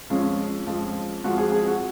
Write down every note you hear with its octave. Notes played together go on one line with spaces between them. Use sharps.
F2 F3 G#3 C#4
F2 F3 G#3
F2 F3 G#3 F#4
G#4
G#4
F#4